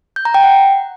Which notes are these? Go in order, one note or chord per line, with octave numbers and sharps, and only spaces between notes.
G6
A#5
G5
F#5